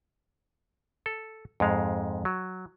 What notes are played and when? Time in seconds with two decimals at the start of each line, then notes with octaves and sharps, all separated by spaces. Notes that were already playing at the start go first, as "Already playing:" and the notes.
1.06 A4
1.60 F2 G#2 G#3 F5
2.25 F#3